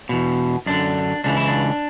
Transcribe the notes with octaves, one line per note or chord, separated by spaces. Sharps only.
E2 B2
F#2 D3 D4
C#2 C#3 E3 D4
E4
D4